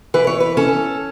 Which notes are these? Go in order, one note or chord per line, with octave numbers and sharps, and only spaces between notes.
E3 B4
C#5
B4
C#4 A4